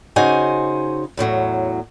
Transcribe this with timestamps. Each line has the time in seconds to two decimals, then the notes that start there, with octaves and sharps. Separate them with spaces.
0.16 C#3 D#4 F#4 C5 G#5
1.17 E2 A2 F3 F#3